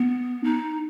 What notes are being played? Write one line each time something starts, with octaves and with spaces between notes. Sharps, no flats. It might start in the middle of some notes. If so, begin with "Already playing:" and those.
Already playing: B3
D#4